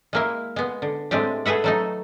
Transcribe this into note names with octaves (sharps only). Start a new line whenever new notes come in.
G#3 A#3 E4
G#3 B3
D3
A2 G#3 C4 D4 G4
A3 G#4 B4 E5 F#5
F#3 A3 D#4